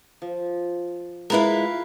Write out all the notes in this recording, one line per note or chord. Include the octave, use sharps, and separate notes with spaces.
F3
G#3 E4 F4 A#4 B4 F5